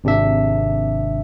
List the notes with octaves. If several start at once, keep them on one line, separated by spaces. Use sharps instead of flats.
G#1 C3 D4 G4 E5